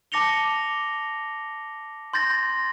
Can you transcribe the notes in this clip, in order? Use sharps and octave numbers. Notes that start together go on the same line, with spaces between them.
A5 D6 A#6 C#7 F7 G7
C6 G6 A6 A#6